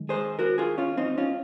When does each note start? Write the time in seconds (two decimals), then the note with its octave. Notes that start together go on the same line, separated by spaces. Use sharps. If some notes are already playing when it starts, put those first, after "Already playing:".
Already playing: D#3 G#3
0.09 G#4 C5
0.39 F#4 A#4
0.58 F4 G#4
0.78 C#4 F4
0.97 C4 D#4
1.18 C#4 F4